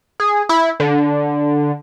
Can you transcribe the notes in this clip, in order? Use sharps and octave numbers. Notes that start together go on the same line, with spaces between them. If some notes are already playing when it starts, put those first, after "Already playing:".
G#4
E4
D3